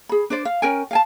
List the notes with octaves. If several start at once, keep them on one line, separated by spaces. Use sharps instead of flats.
G#4 B5
D4 C5 D5
F5
C#4 A#4 G5 G#5
F5 G#5 A5